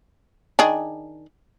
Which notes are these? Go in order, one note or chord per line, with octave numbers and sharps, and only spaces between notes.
D#3 D4 G#4